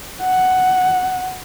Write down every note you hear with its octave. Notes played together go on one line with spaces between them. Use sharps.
F#5